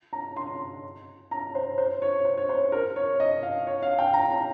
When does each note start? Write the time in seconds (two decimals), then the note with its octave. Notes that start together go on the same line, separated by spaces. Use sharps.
0.13 A#5
0.37 C6
1.31 A#5
1.55 C5
1.78 C5
2.02 C#5
2.25 C5
2.38 C#5
2.49 C5
2.72 A#4
2.96 C#5
3.20 D#5
3.43 F5
3.67 C#5
3.82 F5
3.99 G5
4.14 A#5
4.30 A#5